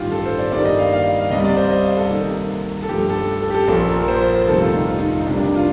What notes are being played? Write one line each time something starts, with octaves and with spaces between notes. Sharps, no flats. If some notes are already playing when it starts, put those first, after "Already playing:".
Already playing: A1 G2 D#3 F4 G4
A4
C5
D5
G2 D#3 G3 A#3 D5
D#5
F5
F5
F5
C2 C3 G3 D#5
D5
C5
D#5
F5
A4
C2 C3 D#3 A#3
A4
G2 F3 A3 G4
A4
A4
G4
A4
A#1 A#2 F3 A#3 A4
A#4
C5
C5
C5
F1 F2 C3 D#3 G3 A4
F4
D#4
F4
D#4
D#4
C2 C3 G3 A#3 D4
D4
F4